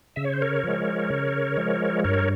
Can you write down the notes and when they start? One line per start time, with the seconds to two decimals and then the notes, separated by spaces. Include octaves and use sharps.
0.16 C#3 E5
0.25 C#5
0.34 C5
0.42 A#4 C#5
0.63 F3 G#3
1.10 C#3
1.57 F3 G#3
2.04 G2 A#4 C#5